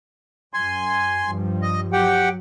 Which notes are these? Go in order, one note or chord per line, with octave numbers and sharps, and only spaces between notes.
F#2 G#5 C6
G2 F3 G3
D#5
F#3 G4 F#5 G5